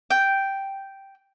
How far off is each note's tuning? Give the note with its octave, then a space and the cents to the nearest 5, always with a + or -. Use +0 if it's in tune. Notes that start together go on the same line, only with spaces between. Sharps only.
G5 -5